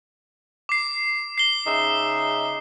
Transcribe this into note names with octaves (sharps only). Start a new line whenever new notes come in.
D6 C7
C7 G7
C#3 D#4 E5